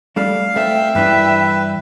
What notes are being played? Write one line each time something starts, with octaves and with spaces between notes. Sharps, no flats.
G3 A3 D4 F5
A3 C4 E5 G5
G2 E3 D4 B4